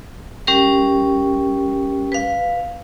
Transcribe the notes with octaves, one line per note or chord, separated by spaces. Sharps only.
G3 C#4 G4 A#4
B4 F5